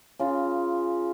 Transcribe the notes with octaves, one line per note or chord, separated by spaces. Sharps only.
C#3 F4